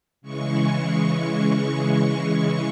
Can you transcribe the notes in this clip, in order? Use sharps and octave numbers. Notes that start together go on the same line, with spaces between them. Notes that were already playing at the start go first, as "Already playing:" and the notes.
C#3 E3 G#3 C#6